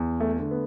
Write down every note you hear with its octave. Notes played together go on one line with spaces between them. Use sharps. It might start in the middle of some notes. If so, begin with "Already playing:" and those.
Already playing: E2
A3
D3 A3
B3